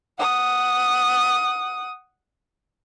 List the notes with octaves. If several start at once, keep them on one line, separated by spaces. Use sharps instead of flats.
F#5 D#6